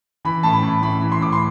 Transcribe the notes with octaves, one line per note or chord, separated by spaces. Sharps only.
E3 B5
A2 A5
B5
A2
A2 B5
E3
C6
A2 D6
C6